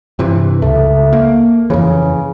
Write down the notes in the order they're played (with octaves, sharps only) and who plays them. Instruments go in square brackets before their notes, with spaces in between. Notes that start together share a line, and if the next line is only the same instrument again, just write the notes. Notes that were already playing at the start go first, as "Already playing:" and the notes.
[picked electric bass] G2 C3 E3
[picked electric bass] C#2 [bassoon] A3
[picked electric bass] A#3
[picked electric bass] F2 E3 [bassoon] C#3